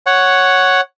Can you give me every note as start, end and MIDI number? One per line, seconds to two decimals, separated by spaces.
0.06 0.81 73
0.06 0.81 78